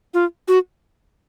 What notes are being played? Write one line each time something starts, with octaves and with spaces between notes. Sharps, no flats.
F4
F#4